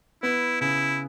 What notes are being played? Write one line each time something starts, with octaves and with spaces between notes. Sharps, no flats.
B3 E4
C#3 E4